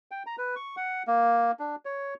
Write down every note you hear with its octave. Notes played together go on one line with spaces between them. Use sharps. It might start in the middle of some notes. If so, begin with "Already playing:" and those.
G5
A#5
B4
C#6
F#5
A#3
D4
C#5